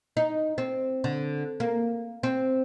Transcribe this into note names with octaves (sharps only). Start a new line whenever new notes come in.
D#4
C4
D3
A#3
C4